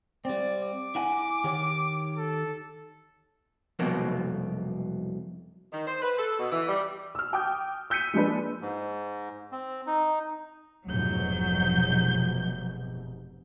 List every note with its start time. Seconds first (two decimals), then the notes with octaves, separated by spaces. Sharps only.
0.25 G3 C4 D5
0.62 D6
0.95 E4 F#5 G#5
1.44 D#3 G4 C#5
2.17 A4
3.79 C2 F2 B2 F#3 A#3
5.73 D#3
5.87 C5
6.02 B4
6.19 A4
6.40 B2
6.52 E3
6.68 G3
7.15 E6 F6
7.33 G5 D6 D#6 G6
7.90 E6 G6 B6 C#7 D#7
8.13 F3 G#3 A#3 D4 B4
8.61 G#2
9.52 C4
9.87 D#4
10.87 F1 G#2 B2 F#3 G6